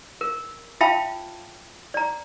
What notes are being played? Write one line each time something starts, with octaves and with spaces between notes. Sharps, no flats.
A#4
F4 E5 F5 G5 A5 B5
D5 A#5